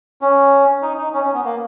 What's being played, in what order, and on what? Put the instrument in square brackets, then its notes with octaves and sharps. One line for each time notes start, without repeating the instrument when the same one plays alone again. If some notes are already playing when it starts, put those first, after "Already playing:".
[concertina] C#4
D#4
D#4
C#4
C#4
B3
A#3